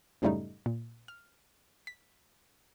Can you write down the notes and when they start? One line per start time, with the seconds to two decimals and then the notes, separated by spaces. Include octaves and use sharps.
0.22 F#2 A2 C#3 G3 A3 D#4
0.66 A#2
1.08 F6
1.87 B6